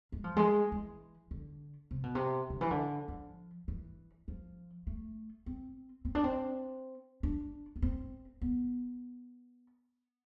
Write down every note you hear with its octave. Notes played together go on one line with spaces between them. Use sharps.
G#3
F3
G#3
E3
D3
C3
B2
C3
D3
E3
D3
F3
E3
F3
A3
C4
C4
D4
C4
D4
B3
C4
B3